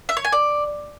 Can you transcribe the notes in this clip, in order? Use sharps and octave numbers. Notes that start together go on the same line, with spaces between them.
E5
C#5
G#5
D5